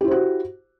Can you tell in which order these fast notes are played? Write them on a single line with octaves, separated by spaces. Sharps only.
G4 E4 C5 F#4